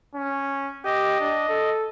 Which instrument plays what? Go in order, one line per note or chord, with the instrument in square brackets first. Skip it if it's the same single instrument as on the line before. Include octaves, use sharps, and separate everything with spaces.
[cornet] C#4
[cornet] G4 [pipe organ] D#5
[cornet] D4
A4